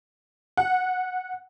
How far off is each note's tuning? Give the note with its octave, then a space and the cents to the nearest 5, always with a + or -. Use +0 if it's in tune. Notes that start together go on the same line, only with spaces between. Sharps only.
F#5 -10